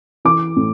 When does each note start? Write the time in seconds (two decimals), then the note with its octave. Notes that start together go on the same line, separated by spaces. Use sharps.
0.25 E3 D6
0.57 A2